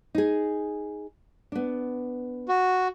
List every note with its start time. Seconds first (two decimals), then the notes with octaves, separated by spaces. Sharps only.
0.15 D#4 G#4
1.52 B3 D4
2.49 F#4